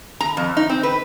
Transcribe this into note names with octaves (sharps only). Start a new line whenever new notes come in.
A#5
F2
D#4
C4
B4